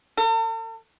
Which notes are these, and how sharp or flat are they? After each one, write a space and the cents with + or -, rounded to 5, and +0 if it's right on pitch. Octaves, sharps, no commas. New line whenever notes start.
A4 +45